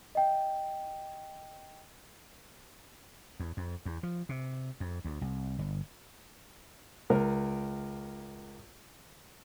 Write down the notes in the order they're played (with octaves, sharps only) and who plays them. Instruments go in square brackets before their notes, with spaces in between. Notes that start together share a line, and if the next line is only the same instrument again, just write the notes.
[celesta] D#5 G5
[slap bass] E2
F2
E2
F3
C3
F2
D2
C2
G1
[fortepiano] C#2 A#4